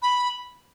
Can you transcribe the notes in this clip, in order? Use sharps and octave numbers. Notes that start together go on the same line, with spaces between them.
B5